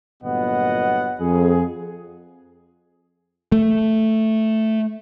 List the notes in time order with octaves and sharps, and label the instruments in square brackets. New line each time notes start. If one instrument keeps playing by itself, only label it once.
[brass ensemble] G1 A#2 F#3 B3 D#5 F#5
F2 G#4
[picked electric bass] A3